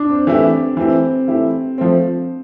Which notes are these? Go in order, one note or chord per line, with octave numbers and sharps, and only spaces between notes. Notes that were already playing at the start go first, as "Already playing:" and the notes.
Already playing: D4
C4
E3 A3 E4 G4
E3 A3 C4 E4 G4
E3 A3 E4 G4
F3 A3 C4